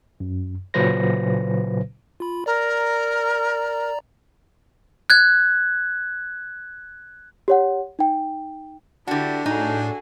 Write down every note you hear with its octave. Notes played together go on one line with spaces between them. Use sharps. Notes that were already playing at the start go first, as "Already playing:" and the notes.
F#2
A#2 C#3 F#3 B4 C5 A#6
F4 B5
A#4 D5 A#5
F#6 G#6
G4 C#5 F#5
D#4 G5
D3 D4 E4 F#4 G4
A2 D#4 F#4 G#4 A4